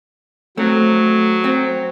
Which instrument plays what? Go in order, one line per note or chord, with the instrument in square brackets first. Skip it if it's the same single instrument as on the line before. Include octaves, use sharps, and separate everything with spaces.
[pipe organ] F#3 [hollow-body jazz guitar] A3 C4
[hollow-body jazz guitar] C4